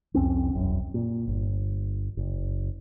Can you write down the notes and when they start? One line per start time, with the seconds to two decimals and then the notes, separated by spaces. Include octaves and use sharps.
0.14 C2 F2 C4 C#4
0.54 E1 B1 F#2
0.94 A#2
1.27 G1
2.17 F#1